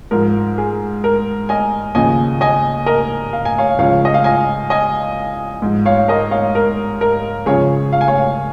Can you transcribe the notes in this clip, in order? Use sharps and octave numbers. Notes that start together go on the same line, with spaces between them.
G#2 F3 A#4
G#4
A#4
D#5 G#5
D#2 C#3 F3 D#5 G#5
D#5 G#5
A#4 D#5
F5
G#5
C#5 F5
C#2 C#3 F3 C#5 F5
D#5
F5
D#5 G#5
D#5 G#5
G#2 F3
C#5 F5
A#4 D#5
C#5 F5
A#4
A#4
C#2 C#3 F3 G#4 C#5
F5
G#5
C#5 F5